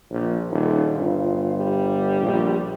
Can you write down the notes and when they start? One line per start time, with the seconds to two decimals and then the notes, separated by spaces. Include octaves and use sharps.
0.11 A#1
0.51 D#1 C#4
0.92 G1 F4
1.56 G3
2.21 A#1